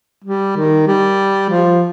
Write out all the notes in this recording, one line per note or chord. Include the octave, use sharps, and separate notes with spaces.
G3
D#3
G3
F3